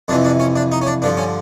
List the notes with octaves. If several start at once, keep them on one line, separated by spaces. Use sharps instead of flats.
F2 C3 E3 D4
D4
C#4
D4
D#4
C#4
D4
G2 D3 F3 D4
C#4